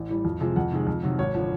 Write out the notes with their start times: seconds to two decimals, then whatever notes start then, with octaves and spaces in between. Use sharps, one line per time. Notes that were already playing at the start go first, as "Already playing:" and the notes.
Already playing: A1
0.09 A2 E3 G3
0.25 F2
0.41 C3 F3 G#3
0.56 F2 F#5
0.72 C3 D#3 G#3
0.87 F2
1.03 C3 D#3 F#3
1.18 G#1 C#5
1.35 D3 F3